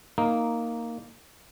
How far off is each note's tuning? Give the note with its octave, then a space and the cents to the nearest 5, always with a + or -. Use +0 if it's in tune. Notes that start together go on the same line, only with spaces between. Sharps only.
A#3 -5 D#4 +0